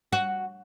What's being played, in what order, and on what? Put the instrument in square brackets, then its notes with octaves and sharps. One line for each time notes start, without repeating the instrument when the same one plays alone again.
[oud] F#4